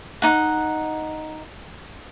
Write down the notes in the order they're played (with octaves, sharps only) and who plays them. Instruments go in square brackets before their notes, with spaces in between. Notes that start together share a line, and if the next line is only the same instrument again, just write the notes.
[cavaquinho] D#4 F#5